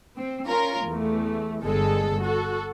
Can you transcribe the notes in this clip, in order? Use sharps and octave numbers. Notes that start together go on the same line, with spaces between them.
C4
C#4 F4 A#4
E2 A3
G1 G#3 A4
F#4 A4